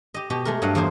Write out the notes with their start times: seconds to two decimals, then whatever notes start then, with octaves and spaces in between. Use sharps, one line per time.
0.14 G4 D#5
0.30 B2 G4 D#5
0.45 G#3 A3 A#4
0.62 G2 F#3 D#5 F5 F#5
0.75 E2 F3 A#3 A#4 C5